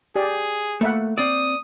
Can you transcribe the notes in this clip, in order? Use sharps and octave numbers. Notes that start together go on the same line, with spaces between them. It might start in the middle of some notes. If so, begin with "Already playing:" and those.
G4 G#4 D5
A3 A#3 E5 F#5
C4 D5 D#6